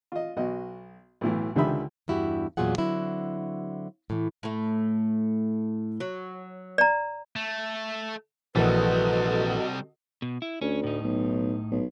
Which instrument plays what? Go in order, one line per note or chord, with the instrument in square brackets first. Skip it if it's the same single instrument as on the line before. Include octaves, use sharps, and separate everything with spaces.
[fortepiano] F4 D#5
B1 F#4 D#5
B1 A2 E3
C#2 D3 D#3 G4 E5 B5
[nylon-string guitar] E2 G2 E4 F#4 G4
E2 A#2 F#3 F4 G#4 F#5
D3 F#3 C4 E4 F#4
A2 E3
[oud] A2 A3
F#3
[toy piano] D5 A#5
[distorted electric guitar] A3
[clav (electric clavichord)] A#1 E3 [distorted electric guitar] C3 G3 [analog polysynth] F#4 A4 D#5 [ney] B4
[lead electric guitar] B2
E4
[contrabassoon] D2 [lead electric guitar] C#4
[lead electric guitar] A2 D#4
[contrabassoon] B1
B1